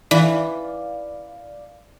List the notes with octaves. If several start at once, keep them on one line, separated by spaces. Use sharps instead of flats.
E3 D5 F5